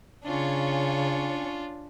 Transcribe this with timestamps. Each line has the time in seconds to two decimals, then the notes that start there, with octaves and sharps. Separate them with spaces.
0.24 C#3 C#4 D4 F4 C#5 C#6